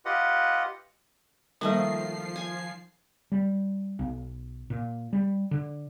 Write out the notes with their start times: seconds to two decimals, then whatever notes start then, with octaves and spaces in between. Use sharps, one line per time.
0.05 F4 G4 B4 D#5 F#5
1.61 D#3 F3 G3 A3 A#3 D#5 C7
2.36 G#5
3.32 G3
3.99 B1
4.70 A#2
5.13 G3
5.51 D3